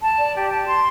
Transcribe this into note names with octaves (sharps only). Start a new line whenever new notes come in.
A5
D5
G4
A5
C6